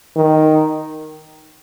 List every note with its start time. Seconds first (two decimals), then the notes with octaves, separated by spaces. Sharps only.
0.16 D#3